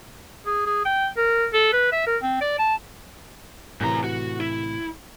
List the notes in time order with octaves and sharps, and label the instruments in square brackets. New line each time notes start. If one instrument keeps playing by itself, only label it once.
[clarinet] G#4
G#4
G5
A#4
A4
B4
E5
A#4
C4
D5
A5
[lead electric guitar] F#2 A#5 [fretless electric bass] A2 C3 E3
[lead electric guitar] F#4
E4